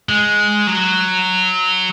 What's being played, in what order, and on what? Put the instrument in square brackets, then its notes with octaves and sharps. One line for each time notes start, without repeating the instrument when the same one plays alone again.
[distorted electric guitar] G#3
F#3